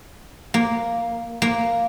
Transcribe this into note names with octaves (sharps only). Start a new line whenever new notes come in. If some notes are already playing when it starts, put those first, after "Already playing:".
A#3
A#3